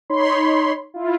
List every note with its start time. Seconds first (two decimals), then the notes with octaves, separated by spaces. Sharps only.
0.10 D#4 C#5 B5 C6
0.94 E4 F4